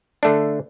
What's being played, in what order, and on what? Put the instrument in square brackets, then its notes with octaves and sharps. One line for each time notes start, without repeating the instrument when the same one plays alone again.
[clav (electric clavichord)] D3 A3 D4